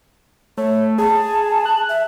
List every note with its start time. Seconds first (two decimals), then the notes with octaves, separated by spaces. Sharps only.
0.57 A3 C#5
0.99 G#4 A5
1.66 F#6
1.89 E5